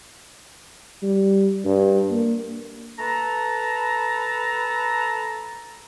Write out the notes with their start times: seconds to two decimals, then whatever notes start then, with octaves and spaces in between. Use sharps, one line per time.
1.03 G3
1.65 G2
2.11 A#3
2.98 A4 B4 A5 A#5